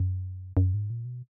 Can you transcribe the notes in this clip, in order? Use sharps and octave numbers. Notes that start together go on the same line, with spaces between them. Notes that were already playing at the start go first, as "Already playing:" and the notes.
Already playing: F#2
F#2
G#2
A#2
B2